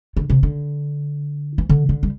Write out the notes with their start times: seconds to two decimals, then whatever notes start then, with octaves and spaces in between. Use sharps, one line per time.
0.17 D3
0.30 C3
0.43 D3
1.58 E3
1.69 D3
1.89 D3
2.03 G3